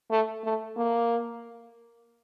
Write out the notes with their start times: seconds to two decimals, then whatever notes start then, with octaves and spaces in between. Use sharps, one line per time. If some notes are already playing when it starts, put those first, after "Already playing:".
0.11 A3
0.44 A3
0.77 A#3